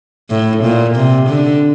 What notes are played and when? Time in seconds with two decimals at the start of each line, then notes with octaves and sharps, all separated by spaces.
0.30 A2
0.63 A#2
0.95 C3
1.29 D3